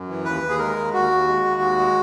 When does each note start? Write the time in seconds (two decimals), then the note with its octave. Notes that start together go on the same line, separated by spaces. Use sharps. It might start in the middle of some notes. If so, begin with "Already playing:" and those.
Already playing: F#2
0.08 E3
0.24 D#2 B4
0.42 D#2
0.49 G#4
0.58 G#3 A#4
0.76 D#2
0.93 D#2 F#4
1.11 D#2
1.27 G#3
1.45 D#2
1.61 G#3
1.79 G#3